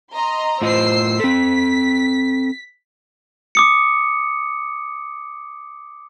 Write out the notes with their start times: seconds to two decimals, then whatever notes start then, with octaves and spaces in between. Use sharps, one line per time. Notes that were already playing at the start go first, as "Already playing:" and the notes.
0.12 D#5 A#5 C6
0.62 A2 F4 C5 D#5 E6 C7
1.20 C4 A4 B6
3.55 D6 D#6 C#7